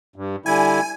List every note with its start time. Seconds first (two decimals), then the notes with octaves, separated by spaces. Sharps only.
0.16 G2
0.46 D3 G3 E4 G#5